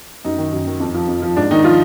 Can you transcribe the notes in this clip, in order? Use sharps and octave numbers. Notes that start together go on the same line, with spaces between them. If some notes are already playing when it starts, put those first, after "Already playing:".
F#2 D#4
D#3
F#2
D#3
F2
F3
F2
F3
G#2 D4
D#3 D#4
F3 F4